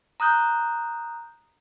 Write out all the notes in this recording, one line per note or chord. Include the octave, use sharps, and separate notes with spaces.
A#5 D#6 F#6 G6